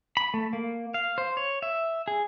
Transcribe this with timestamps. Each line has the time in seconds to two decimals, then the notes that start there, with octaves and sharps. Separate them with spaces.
0.17 B5
0.34 A3
0.53 A#3
0.94 F5
1.18 C5
1.37 C#5
1.62 E5
2.08 G#4